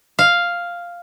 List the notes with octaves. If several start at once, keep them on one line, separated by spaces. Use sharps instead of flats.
F5